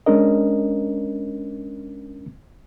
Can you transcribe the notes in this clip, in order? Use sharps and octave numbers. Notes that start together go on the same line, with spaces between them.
G#3 C#4 D4 A#4 D#5